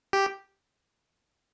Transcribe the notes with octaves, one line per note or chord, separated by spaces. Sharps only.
G4